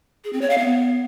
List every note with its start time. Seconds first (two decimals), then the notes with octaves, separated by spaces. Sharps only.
0.24 G#4
0.33 C4
0.41 C#5
0.50 F5
0.58 B3